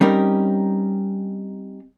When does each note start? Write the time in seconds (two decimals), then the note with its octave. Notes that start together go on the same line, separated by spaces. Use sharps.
0.01 G3 C4 C#4 D#4 G4 A#4